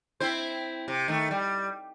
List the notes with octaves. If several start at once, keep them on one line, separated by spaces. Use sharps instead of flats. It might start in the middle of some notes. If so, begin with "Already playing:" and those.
C4 E4 C5
C3
D#3 A3
G3